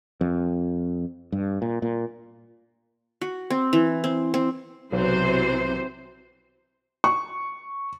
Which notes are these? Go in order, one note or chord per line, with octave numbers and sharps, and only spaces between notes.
F2
G2
A#2
A#2
F#4
C4
E3
C4
C4
B1 C3 E3 F#3 C5
C#6